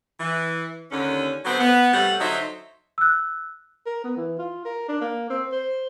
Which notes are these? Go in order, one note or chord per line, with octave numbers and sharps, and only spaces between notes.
E3
D#2 D3 C#4
D3 F#3 B3 C4 C5
B3
C3 G3 A3 C#5 F#5
D3 F#3 D#4 C5 D#5 E5
E6 F#6
A#4
B3
E3
F4
A#4
D4
A#3
C4
C5